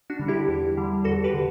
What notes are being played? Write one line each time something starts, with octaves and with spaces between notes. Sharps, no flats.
D4 F#4
D3 G3
E4 G4
E2
D3 G3
E2 F#4 A4
G4 B4
D3